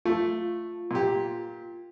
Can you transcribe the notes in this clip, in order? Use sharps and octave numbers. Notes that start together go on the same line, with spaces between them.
A3 F4
A#2 G4